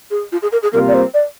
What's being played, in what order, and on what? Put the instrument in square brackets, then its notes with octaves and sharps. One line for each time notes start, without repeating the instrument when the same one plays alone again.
[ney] G#4
F4
G#4
A#4
G#4
[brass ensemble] C3 G3 A#3 F4 [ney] A#4
[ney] D5
C5
D5